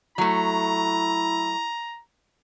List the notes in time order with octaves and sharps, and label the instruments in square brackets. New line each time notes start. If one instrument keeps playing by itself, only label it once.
[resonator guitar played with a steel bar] F#3 A3 [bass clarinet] E4 [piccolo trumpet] A#5